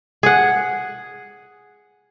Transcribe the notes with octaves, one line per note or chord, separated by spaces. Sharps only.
G#4 F#5